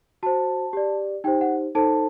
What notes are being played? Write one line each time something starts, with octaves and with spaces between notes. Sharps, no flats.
F#4 C5 A5
G4 D5
D#4 G4 C5 G5
F#5
D#4 A4 C5 A5